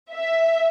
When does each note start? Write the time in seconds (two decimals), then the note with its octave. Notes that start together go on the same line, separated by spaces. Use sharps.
0.14 E5